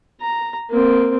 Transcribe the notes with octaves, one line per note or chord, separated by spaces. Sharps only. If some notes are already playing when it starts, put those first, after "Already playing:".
A#5
A#3 C4